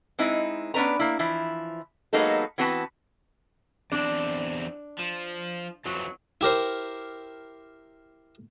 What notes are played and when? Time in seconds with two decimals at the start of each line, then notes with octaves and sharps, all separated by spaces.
0.19 G#3 C4 D#4 E4
0.74 B3 C#4 D4 B4 A#5
0.99 A#3 E4
1.19 E3 F3 E4
2.13 F#3 G#3 A#3 B3 D#4 A4
2.58 E3 B3 C4 F#4 B4 A5
3.92 E2 C4 D4
4.99 F3
5.85 F2 E3 F#3
6.41 E4 G4 A#4 C5